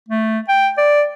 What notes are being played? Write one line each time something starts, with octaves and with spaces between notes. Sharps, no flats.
A3
G5
D5